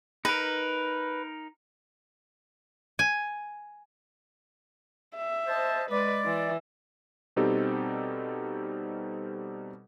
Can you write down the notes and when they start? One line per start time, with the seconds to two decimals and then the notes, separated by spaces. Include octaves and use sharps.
0.25 D#4 A#4 B4
2.99 G#5
5.16 E5
5.47 C5 D#5 A5
5.90 G#3 B4 D5
6.26 E3
7.36 B2 G3 C4 D#4 G4 A4